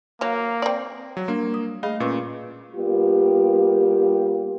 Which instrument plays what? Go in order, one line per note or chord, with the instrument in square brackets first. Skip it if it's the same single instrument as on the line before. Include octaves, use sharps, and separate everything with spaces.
[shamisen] F#3 F5 [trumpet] A#3
[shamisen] C4 D5
[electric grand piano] F#3
[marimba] G3 D4 [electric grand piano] A#3
[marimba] D#6
[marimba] A3 G#4 B5 [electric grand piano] D#5 F5
[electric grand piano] A#2 [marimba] C#4 B4 C#6
[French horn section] G3 A#3 B3 F4 G4